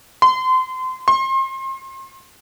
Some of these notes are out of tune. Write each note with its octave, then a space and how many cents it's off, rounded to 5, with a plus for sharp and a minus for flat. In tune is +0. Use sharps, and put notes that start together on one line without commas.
C6 -30
C6 +35